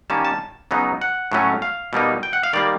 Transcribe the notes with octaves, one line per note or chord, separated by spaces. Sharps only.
D#3 G3 A#3 C#4 A5
A5
C#3 F#3 B3 D#4
F#5
A2 F#3 A3 C#4
F5
B2 G3 A#3 D#4
G5
F#5
F5
D#3 G3 A#3 D5